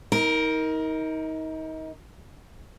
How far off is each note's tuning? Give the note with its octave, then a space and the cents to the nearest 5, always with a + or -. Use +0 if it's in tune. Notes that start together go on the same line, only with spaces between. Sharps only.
D#4 +30 A#4 +0